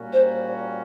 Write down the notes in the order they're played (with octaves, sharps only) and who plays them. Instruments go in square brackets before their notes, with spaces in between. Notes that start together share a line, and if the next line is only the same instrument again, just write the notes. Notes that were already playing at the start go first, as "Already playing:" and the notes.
Already playing: [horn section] A#2 G3 A#3 C#4 F#4
[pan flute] C5